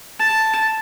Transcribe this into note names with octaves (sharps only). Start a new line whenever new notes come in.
A5